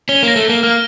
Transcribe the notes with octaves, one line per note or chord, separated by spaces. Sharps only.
C#4 G7
A#3 A#6
A3
A#3 G7
A#3 F6